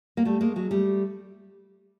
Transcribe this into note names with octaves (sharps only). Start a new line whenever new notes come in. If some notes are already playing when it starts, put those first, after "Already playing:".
A#3
G3 A3
G#3 A#3
F#3 G#3
G3 A3